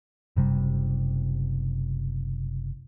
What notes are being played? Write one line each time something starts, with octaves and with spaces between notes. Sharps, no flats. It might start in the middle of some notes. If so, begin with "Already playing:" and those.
F#1 C3 G3